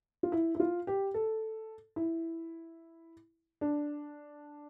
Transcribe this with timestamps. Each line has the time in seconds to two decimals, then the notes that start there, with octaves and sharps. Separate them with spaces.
0.23 F4
0.32 E4
0.55 E4
0.60 F4
0.87 G4
1.14 A4
1.96 E4
3.61 D4